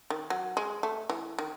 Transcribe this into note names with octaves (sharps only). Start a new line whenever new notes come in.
D#3
F#3
G#3
A3
E3
D#3